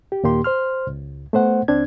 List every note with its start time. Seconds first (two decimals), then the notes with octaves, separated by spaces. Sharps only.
0.12 G4
0.24 D#2 A#2 A#3 G4 C6
0.44 C5 C6 F6
0.87 C#2
1.33 A3 B3 C5 F#5
1.68 C#2 C4 D4 G#6